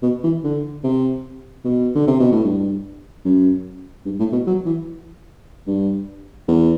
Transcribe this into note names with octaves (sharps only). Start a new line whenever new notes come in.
B2
E3
D3
C3
B2
D3
C3
B2
A2
G2
F#2
G2
A2
B2
F#3
E3
G2
E2